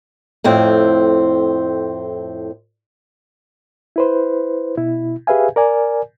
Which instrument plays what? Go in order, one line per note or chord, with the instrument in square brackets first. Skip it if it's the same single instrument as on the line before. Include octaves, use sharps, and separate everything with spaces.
[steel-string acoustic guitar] F2 A2 C4
[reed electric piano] E4 B4 C5
B2 E4
G4 G#4 B4 E5 F5 G#5
A#4 D5 G#5